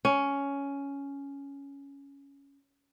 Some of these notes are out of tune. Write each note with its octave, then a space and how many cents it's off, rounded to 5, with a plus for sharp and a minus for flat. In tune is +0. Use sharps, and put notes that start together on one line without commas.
C#4 +10